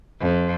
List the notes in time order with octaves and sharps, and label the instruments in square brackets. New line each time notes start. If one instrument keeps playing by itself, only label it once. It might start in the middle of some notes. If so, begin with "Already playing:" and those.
[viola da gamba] F2